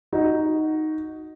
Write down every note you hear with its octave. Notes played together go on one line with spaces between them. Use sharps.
D#4 F#4